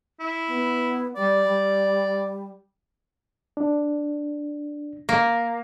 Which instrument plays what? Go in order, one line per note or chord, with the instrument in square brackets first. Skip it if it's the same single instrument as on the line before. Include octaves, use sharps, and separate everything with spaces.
[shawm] E4
[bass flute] B3
[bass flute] G3 [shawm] D5
[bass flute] G3
[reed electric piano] D4
[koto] A#3